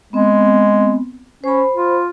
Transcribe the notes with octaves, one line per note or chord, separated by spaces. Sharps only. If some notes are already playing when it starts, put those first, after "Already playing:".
G#3 B3 C4
C#4 C5 B5
F4